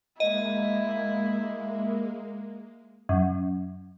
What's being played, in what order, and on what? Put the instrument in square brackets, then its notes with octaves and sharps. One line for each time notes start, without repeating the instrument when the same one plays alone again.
[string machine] G#3 A#3 [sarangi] E4 [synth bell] D#5
[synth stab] F#2